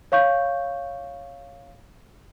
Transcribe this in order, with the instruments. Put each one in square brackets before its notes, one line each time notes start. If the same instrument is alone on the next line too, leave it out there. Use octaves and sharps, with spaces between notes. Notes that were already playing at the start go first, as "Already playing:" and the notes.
[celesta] C#5 F5 C#6 G6